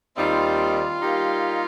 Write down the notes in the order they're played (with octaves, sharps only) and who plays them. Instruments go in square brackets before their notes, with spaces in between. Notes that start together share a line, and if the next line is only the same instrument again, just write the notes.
[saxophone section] D#2 D#3 G3 C4 D#4 [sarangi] F4
[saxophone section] G3 A#3 D#4 G4